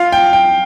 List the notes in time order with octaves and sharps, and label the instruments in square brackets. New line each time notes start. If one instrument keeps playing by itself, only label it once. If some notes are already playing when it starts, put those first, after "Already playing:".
Already playing: [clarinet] F4 [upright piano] F5
[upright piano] G5
G5